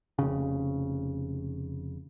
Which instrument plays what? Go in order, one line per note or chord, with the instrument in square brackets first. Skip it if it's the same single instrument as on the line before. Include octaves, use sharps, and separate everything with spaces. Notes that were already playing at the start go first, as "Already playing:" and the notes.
[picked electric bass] F1 C#3